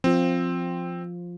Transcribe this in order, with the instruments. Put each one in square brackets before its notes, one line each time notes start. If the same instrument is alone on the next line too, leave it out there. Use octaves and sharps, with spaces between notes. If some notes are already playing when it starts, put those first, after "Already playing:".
[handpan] F3 F4 [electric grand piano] C4